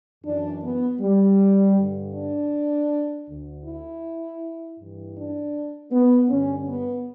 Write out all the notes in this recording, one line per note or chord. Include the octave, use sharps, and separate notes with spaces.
F#2 E3 D4
B3
G3
G2 D3
D4
D2 D3
E4
G2 E3
D4
B3
G2 D3 C#4
B3